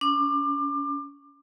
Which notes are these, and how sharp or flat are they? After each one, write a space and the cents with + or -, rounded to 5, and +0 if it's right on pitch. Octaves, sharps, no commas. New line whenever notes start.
C#4 +35 D6 +30